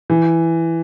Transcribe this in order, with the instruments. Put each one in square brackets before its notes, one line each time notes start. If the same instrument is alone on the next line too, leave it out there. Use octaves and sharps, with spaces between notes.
[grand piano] E3